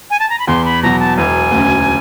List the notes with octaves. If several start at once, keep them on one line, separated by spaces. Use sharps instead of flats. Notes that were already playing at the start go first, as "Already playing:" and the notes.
G#5
A5
A#5
B5
E2 C6
B5
B2 F#3 A#5
A5
E1 G#5
D2 C#3